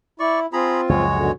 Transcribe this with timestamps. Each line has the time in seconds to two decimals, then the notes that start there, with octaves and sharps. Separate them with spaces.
0.20 E4 D5 C#6
0.53 C4 F4 G#4 A#5 B5
0.89 C#2 F#2 F3 G#3 F#4 C#5
1.15 B2 D3